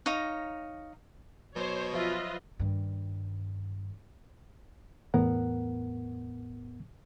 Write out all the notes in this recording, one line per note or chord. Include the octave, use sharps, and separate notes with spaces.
D#4 C#5 F5 A#5
B2 F#3 C5 C#5
F3 F4 B4 C5 D#5 E5
G2 D#3
E2 A2 B3 A#4 F#5